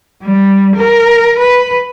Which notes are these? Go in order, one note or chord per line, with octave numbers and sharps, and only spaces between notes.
G3
A#4
B4